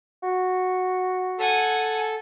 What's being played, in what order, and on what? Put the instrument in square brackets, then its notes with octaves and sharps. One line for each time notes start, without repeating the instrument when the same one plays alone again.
[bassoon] F#4
[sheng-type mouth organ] A4 [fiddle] F#5 G#5